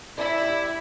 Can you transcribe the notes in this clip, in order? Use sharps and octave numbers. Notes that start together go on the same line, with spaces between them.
E4 D5
G4